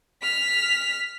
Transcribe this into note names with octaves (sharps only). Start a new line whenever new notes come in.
F6 B6